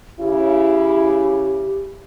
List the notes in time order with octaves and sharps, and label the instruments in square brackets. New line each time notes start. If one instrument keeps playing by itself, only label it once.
[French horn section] C#3 E4 [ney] G4